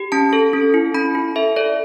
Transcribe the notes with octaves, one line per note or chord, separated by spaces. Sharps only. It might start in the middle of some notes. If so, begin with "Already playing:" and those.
Already playing: G4
C#4 A5
A4
C#4
E4
C#4 B5
E4
A4 E5
A4 D5